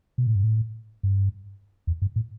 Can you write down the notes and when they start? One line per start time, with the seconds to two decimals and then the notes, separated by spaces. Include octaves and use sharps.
0.18 B2
0.27 A2
0.35 G2
0.44 A2
1.03 G2
1.87 E2
2.02 G2
2.16 A2